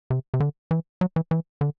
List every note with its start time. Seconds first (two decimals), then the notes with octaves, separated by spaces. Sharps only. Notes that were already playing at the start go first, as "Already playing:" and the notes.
0.10 C3
0.34 C3
0.40 D3
0.71 E3
1.01 F#3
1.16 E3
1.31 E3
1.61 D3